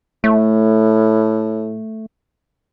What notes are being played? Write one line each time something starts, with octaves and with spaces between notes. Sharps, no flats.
A2 A3